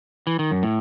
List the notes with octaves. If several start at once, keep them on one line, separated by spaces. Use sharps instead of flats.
E3
D#3
F#2
A2